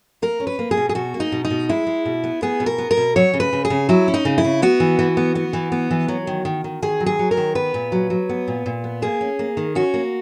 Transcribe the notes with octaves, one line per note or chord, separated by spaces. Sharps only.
A#3 A#4
C#4
B4
A#3
G#4
B2
G#4
B2 F#4
A#3
D#4
B2
D#4
B2
G#3 E4
G#3
B2
B3
B3 G#4
B2
A#4
B3
A#4
B2
F#3 C#5
C#3
B4
C#3
G#4
C#3
F#3 E4
C#4
D#4
C#3
E4
C#3
B3 F#4
E3
E3
B3
B3
E3
B3
E3
F#3
D#3
D#3
D#3
D#3 G#4
F#3
G#4
F#3
A#4
D#3
B3 B4
A#2
F#3
F#3
B3
A#2
A#2
B3
A#3 G#4
C#4
A#3
D#3
C#4 F#4
A#3